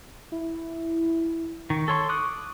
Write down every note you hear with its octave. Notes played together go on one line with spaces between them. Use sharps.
E4
D#3 C#6
A4 C#5 C6
D6 D#6 F#6